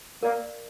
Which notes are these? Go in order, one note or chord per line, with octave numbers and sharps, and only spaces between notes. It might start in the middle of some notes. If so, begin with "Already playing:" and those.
A#3 A#4 D5 F5